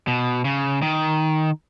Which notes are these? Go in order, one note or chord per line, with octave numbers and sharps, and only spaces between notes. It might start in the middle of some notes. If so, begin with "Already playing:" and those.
B2
C#3
D#3